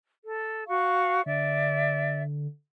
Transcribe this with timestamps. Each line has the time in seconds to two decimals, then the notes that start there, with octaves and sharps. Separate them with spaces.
0.24 A4
0.67 F#4 F5 C#6
1.26 D3 D5 E5